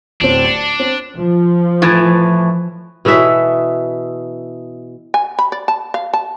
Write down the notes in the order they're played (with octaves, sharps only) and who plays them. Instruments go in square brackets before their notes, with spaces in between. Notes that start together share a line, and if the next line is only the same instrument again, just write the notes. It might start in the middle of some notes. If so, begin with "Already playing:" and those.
[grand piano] D1 C4 [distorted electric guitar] D4
[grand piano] C#7
C4
[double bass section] F3
[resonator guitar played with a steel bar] A2 E3
[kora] B2 E3 A4 E5
[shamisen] G#5
B5
D5
A5
F5
A5